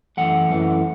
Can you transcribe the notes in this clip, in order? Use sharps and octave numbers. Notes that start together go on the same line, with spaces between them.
F#2 E3 A3 F#5
F#2 E3 A3